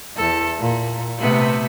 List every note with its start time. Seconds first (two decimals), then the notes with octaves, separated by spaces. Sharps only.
0.17 E2 A4
0.60 A#2
1.20 C3 A3 B3